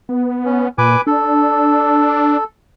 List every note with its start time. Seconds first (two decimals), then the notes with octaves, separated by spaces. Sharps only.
0.09 B3
0.45 C#4
0.78 A#2 B4 G#5 D6
1.07 D4 A4